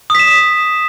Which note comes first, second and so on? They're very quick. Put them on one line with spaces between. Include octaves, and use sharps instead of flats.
D#6 B6 E7